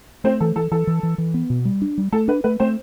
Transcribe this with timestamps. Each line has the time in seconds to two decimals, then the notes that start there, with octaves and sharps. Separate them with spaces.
0.24 A3 C4 C5
0.40 E3 A4
0.56 E3 A4
0.71 E3 A4
0.87 E3
1.03 E3
1.18 E3
1.34 B3
1.50 B2
1.65 G3
1.82 D4
1.98 G3
2.12 A3 A4
2.28 D4 B4
2.44 A3 B4
2.60 A3 C4 C5